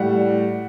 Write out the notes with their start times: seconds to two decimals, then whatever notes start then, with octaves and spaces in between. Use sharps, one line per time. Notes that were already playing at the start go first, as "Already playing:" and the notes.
Already playing: A2 G3 F#5